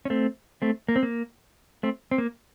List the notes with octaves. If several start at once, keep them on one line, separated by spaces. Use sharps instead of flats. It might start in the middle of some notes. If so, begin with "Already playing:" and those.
C#4
A3 C4
A3 C4
A#3
C4
A#3
A3 C4
C4
A#3